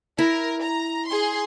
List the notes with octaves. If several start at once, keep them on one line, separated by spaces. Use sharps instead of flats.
E4 A#4
A#5
G#4 C6